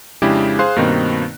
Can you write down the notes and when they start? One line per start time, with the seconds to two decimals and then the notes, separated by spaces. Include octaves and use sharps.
0.22 F2 C#3 G#3 D4 E4 G4
0.59 G#4 C5 F5 C6 F#6
0.76 G2 B2 D#3 A#3 C4 D#4